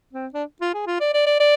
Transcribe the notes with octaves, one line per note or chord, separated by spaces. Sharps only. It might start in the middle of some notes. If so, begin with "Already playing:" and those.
C4
D4
F4
G#4
F4
D5
D5
D5
D5